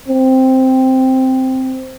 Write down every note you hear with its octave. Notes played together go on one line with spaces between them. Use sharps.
C4